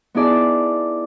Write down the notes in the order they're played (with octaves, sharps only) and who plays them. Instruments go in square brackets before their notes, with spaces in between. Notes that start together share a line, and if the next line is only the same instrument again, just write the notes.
[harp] B3 D#4 E4 G#4 D5 A5